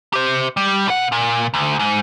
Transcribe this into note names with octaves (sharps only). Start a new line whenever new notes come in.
G4 C5
G3
B2 F#5
A#2
D2
G#2